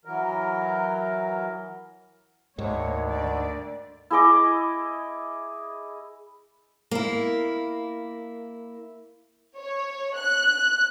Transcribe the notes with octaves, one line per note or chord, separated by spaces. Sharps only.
E3 F#3 A#4
D2 G#2 D#3 A#3 C#5
D3 D5
E4 G#4 D#5 D6
A#3 E4
C#5
F#6